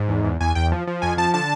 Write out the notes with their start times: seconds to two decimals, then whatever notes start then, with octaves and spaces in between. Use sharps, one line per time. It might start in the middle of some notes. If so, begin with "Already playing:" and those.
Already playing: G#2
0.09 E2
0.24 E2
0.41 E2 G#5
0.55 E2 G5
0.72 F3
0.87 F3
1.02 F2 G#5
1.18 F3 A5
1.34 D3 A5